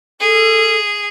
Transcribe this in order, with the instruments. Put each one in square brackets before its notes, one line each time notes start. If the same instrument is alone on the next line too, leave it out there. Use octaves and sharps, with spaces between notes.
[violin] G#4 [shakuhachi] A4